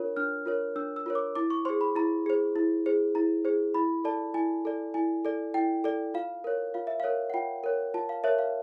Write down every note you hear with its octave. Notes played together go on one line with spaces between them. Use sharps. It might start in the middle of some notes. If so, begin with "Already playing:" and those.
Already playing: D4 F4 A#4 C#5
D4 F6
F4 A#4 C#5
D4 E6
E6
F4 A#4 C#5
D6
E4 D6
C#6
G#4 C5 C6
B5
E4 A#5
G#4 C5
E4
G#4 C5
E4 A#5
G#4 C5
E4 B5
A4 D5 A5
E4 G#5
A4 D5
E4 G#5
A4 D5
E4 G5
A4 D5
F4 F5
A#4 C#5
F4 F5
E5
A#4 C#5 F5
F#5
F4 G5
A#4 C#5
F4 A5
F5
A#4 C#5 E5
F5